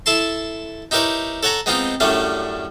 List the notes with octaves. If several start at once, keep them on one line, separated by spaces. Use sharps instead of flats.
E4 A4 A5 C6
D#4 E4 G4 A#4 B4 C#5
A4 C#5 F#5 G#5 A#5
G#3 B3 C4 D#4 F4
F#2 A2 G3 A3 C#4 D4